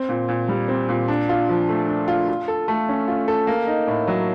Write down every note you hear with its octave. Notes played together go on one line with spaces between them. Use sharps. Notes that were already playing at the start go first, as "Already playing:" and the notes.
Already playing: C4
A#2
A#2
G3
C4
A#2
D4
F4
F3
A3
D4
F4
F4
A4
A3
C#4
F4
A4
A#3
D#4
A2
F#3